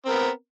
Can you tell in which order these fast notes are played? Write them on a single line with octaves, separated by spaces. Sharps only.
C4 A#4 B3